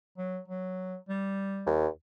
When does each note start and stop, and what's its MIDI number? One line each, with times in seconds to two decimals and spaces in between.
0.18 0.39 54
0.48 0.96 54
1.09 1.75 55
1.66 1.87 39